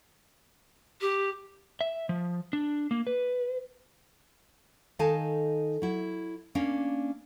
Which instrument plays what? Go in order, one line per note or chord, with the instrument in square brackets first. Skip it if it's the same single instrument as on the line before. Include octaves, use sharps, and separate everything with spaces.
[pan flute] G4
[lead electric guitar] E5
F3
D4
A#3
B4
[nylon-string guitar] D#3 D#4 A4 F5 G#5 A5
F#3 E4
A#3 C#4 D4 F5